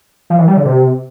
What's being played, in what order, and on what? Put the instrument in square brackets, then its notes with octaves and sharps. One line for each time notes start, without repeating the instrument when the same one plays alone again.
[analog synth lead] F3
E3
G3
D3
C3